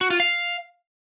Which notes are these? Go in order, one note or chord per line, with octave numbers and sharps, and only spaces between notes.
F#4
F4
F5